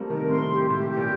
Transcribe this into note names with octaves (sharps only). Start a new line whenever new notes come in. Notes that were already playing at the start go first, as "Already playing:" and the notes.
Already playing: F3 G3 A3 A#3 C4
C3 D#3 A#4
A2 C3 C6
G4
A2 G4
G4
A#2